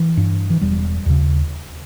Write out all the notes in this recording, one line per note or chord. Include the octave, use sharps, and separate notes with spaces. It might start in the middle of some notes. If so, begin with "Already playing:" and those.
Already playing: E3
G2
E3
E1 G3
D#2 C#3